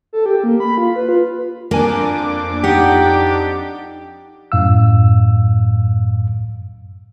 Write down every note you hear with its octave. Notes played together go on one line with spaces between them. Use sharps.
A4
G4
A#3
B5
F4
B4
F4
F2 A#3 D4 A#4 G#5 D6
D#4 G4 F#5
F#2 A2 F5 E6